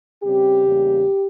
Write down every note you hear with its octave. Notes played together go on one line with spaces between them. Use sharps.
C#3 G3 C4 G4
E2 C#3 G3 A#3